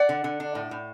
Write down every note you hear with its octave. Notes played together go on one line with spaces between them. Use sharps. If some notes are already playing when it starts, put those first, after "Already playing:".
Already playing: D5 F#5
D3
D3
D4
A2
A2